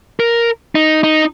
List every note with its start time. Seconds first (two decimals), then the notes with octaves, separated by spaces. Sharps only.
0.20 A#4
0.75 D#4
1.04 D#4